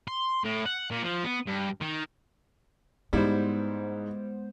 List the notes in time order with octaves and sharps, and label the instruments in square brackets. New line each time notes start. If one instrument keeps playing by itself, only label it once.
[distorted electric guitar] C6
A2
F#5
A#2
F3
B3
G2
D#3
[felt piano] G#2 [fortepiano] G3 E4 [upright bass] G#3 [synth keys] B3 C5